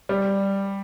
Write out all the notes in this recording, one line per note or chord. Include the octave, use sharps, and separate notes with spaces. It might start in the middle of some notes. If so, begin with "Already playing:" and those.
G3